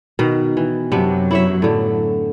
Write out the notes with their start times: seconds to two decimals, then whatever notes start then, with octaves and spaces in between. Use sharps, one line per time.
0.19 B2 D#3
0.57 E3
0.92 F#2 C3 F#3 B3 D4
1.31 E4 C#5 E5
1.62 A2 D3